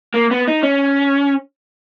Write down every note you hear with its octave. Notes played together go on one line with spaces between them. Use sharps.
A#3
B3
D#4
C#4